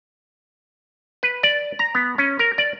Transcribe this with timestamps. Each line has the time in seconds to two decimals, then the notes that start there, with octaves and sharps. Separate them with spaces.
1.23 B4
1.43 D5
1.79 A#5
1.95 B3
2.18 C#4
2.39 A#4
2.58 D5